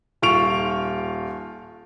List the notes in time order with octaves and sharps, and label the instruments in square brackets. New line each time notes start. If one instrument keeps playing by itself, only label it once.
[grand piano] D#1 F4 C#6 D7 F7